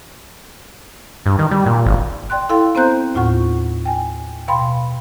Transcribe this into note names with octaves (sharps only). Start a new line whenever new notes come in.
G2
D#3
G3
A#2
G#1
D5 G5 C6 F#6
E4 A4 F5 G5 C6
B3 C4 C5 A#5 F#6 G6
D#2 A2 F4 F#5 C#6
G5 G#5
B2 F5 G5 B5 C6